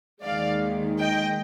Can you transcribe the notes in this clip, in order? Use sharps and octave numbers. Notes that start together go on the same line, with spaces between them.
D#2 D#3 G#3 D5 F5
D#5 G5